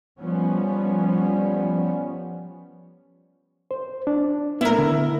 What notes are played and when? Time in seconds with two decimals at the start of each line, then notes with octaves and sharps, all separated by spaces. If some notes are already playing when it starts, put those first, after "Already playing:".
0.21 F3 G3 B3 C#4
3.71 C5
4.07 D4
4.61 A3 B3 E4 A#4
4.78 D3